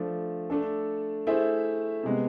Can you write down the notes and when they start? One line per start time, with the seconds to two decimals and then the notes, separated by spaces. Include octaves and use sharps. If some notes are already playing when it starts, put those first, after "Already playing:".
Already playing: F3 A3 D4
0.50 A3 D4 A4
1.27 A3 E4 G#4 C5 E5
2.03 C3 G#3 B3